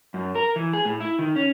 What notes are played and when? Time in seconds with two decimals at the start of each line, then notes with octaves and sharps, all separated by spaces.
0.14 F#2
0.35 A#4
0.56 E3
0.73 G#4
0.85 A2
1.00 E4
1.19 D#3
1.36 C#4